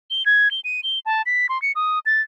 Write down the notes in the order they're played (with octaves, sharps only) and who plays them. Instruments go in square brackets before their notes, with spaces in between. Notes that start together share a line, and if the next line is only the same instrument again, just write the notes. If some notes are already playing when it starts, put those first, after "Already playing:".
[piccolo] G7
G#6
G7
D#7
G7
A5
B6
C6
C#7
D#6
A6